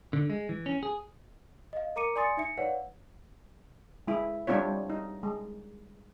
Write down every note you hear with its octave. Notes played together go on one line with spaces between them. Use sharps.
D3
G#3
E3
C#4
G#4
D#5 F5
A#4 A#5 D6 C#7 D#7
D5 G#5 C6 D#6 A6 C#7
D#4 E5 C#7
B4 C#5 D5 F5 F#5
G#3 E4
G3 C4 D4 F4 C#5
D#4
G#3